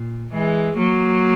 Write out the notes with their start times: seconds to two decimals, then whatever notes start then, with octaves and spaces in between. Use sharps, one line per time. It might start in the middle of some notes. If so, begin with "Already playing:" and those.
Already playing: A#2
0.33 E3 G#3
0.78 F#3 A#3